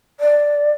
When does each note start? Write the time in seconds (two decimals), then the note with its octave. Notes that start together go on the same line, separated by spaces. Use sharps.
0.20 D5